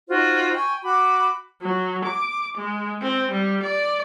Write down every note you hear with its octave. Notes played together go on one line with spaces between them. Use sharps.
D#4 F4 F#4 C5
G5 G#5 C#6
F#4 B5 D6
F#3
D6
G#3
C4
G3
D5